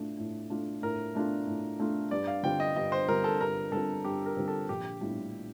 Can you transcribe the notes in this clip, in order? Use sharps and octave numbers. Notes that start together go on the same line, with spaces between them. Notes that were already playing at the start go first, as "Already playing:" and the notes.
Already playing: A2 A3 D4 F4
A2
A3 D4 F4
A2 A#4
A3 D4 F4
A2
A3 D4 F4
G2 D5
F5
D3 G3 C4 F4 G5
D#5
G2 D#5
C5
D3 G3 C4 F4 A#4
A4
G2 A#4
D3 G3 C4 F4 A4
G2 G4
A#4
D3 G3 C4 F4
A4
A#1 G4
A2 G3 D4 F4